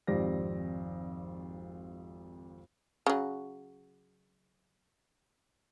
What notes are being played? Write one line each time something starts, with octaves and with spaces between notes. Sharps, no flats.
G#1 F2 G4 C5 D5 A#6
C#3 F#3